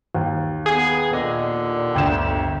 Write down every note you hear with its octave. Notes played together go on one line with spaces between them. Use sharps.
D#2
B3 G#4
A#2 D3 D#5
G1 D2 G2 G5 E7